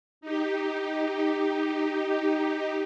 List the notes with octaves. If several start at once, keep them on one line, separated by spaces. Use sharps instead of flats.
D#4 G4